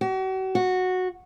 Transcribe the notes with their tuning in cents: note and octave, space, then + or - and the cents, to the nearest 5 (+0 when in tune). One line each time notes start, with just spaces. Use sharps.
F#4 +40
F#4 -10